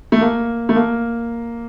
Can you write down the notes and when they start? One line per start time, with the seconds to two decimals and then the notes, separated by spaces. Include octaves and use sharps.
0.12 A3
0.21 A#3
0.69 A3
0.76 A#3